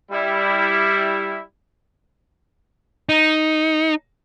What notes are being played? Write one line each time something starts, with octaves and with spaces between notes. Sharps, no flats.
G3 E4
D#4